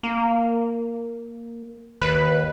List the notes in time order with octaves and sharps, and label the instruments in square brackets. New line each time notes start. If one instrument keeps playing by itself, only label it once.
[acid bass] A#3
[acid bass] D#2 [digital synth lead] B4